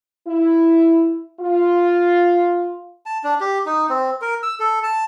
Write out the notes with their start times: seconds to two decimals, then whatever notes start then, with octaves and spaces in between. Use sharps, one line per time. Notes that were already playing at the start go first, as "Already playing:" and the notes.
0.28 E4
1.40 F4
3.06 A5
3.24 D4
3.41 G4
3.66 D#4
3.89 C4
4.21 A#4
4.43 E6
4.60 A4
4.83 A5